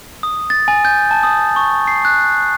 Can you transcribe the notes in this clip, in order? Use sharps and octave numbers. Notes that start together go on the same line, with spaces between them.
D#6
A6
G#5
G6
A5
D#6
C#6
C7
F#6